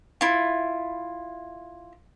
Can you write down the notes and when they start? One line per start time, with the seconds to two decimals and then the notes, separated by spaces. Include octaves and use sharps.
0.21 E4 F4